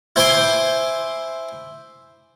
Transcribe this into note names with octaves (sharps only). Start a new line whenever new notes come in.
E4 C5 G#5 C6 D6